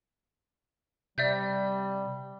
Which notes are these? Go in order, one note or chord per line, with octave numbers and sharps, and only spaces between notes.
C3 G3 D5 E5 G6